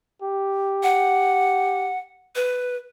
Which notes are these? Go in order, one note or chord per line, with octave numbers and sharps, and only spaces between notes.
G4
F#5
B4